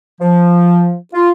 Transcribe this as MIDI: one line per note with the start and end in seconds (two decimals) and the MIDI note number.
0.20 0.95 53
1.14 1.31 65